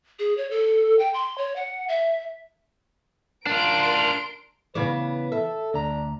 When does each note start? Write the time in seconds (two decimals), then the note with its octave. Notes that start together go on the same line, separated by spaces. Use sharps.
0.19 G#4
0.37 C#5
0.51 A4
0.99 G5
1.14 C6
1.38 C#5
1.56 F#5
1.89 E5
3.47 D4 F4 A#4 C6 D7
4.75 C#3 E3 B3 B4 C#5 D5
5.32 A4 E5
5.74 D2 D4 A#5